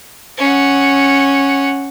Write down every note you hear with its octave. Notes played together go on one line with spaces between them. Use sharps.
C#4 F#5